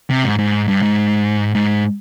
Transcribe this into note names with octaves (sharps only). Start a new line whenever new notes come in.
C3
G#2
G#2
G2
G#2
G#2